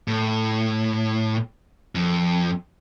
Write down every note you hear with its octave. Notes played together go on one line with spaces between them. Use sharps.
A2
F2